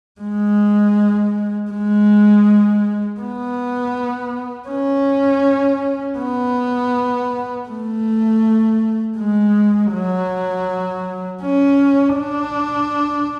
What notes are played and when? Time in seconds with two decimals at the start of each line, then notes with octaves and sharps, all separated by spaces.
0.21 G#3
1.71 G#3
3.20 B3
4.69 C#4
6.19 B3
7.69 A3
9.18 G#3
9.92 F#3
11.42 C#4
12.16 D4